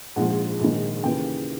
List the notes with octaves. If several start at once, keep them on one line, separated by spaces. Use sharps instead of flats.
A#1 G#2 F3 F#5
A#1 G#2 D#3
D#2 C#3 E3 G5